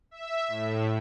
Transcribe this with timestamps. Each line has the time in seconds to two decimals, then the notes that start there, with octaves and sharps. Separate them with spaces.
0.11 E5
0.48 A2